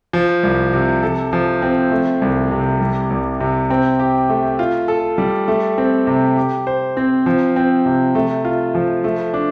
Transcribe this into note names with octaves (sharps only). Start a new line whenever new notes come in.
F3
C2
C3
A4
F3
C4
A3
C2
C3
G3
C2
C3
C4
G4
A3
F4
A4
G3
A3
C4
C3
G4
C5
C4
F3
C4
C3
A3
F4
F3
A3
D4